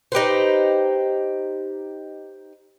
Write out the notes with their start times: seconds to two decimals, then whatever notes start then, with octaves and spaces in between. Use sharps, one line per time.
0.12 D#4 G4 B4 C5